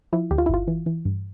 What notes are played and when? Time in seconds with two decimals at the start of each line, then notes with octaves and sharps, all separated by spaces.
0.13 F3 E4
0.31 D2 G4
0.38 F4
0.46 E4
0.49 G1 F4
0.68 E3
0.86 E3
1.05 G2